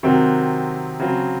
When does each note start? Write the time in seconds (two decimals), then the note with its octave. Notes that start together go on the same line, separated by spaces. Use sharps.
0.03 C3 D#3 F#3 C4 F#4
1.00 C#3 F#3 C4